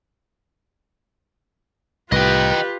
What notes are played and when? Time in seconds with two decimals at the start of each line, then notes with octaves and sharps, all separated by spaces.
2.12 C2 A2 F4 G4 B4 D#5 G5